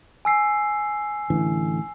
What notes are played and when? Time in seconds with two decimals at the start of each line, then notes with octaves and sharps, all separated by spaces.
0.25 G#5 E6 C7
1.30 A1 D3 E3